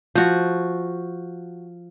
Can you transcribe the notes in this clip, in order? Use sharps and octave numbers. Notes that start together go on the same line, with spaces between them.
F3 F#4